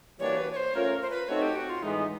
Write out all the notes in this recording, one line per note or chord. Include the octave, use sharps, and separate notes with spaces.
E3 G3 A#3 D4 F#4 C#5
B4
C#5
C5
A3 C#4 F4 A#4 C#5
C5
B4
A3 C4 D#4 F#4 A4 C#5
G4
F#4
F4
A2 E3 G#3 B3 D#4